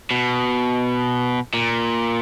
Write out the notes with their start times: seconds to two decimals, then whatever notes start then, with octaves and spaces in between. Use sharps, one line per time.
0.11 B2
1.54 A#2